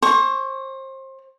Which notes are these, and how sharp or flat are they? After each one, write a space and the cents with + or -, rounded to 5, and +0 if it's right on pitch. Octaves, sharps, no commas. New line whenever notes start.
C5 +30 C#6 +15